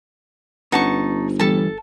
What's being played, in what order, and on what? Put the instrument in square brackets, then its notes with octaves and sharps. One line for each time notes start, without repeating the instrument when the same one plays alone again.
[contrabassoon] G1 [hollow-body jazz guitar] C#4 B4 F#5 [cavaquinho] D#4 A5 C#6
[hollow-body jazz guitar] E3 G3 B3 [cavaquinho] A4 A5